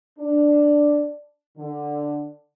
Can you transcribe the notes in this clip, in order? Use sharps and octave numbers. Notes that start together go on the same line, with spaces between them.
D4
D3